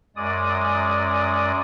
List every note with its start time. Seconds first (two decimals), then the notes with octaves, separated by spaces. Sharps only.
0.16 F#2 G#3 D5 D#6